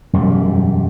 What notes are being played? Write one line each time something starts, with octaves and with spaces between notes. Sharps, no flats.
E1 F#2 G3